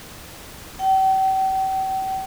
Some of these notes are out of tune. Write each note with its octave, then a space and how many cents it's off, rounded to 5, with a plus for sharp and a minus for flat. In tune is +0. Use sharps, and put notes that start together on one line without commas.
G5 -40